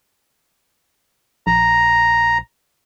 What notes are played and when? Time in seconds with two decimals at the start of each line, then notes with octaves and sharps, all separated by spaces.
1.47 A#1 A#5